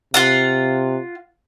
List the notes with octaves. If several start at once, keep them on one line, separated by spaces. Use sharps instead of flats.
C3 F4 F5 F#5